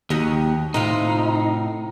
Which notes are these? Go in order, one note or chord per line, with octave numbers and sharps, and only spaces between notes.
D#2 F#3 G4 D#5
A2 C3 D#4 F4